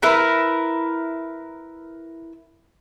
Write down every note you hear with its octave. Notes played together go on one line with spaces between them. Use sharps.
E4 A#4 B4 B5